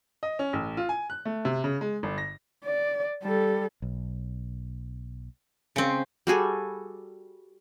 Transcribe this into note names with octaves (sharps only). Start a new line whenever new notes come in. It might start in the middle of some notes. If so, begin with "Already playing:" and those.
D#5
C#4
A1
F4
G#5
F#6
A3
C3
C#3
G#3
G1
A#6
D5
G3 A4
B1
C#3 C4
G3 F#4 G#4 A4